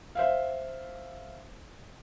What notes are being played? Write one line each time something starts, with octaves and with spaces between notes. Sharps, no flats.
C5 E5 F5